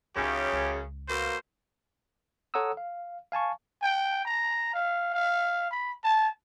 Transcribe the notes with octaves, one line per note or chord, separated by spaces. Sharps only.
C#2 F#2 C#3 D#4 G4
C#2
B2 A#3 C5
A4 C#5 F#5 A#5 D#6 E6
F5
F5 G#5 A5 C#6
G5
A#5
F5
F5
B5
A5